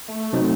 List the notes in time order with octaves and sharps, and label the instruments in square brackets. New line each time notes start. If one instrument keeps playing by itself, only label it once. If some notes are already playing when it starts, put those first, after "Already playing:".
[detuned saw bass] A3
[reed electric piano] C3 F#3 C4 D#4